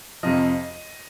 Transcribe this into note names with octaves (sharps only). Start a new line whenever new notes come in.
F2 C3 F3 D#5